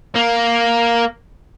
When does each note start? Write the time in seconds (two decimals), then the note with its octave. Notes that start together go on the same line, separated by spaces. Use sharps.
0.16 A#3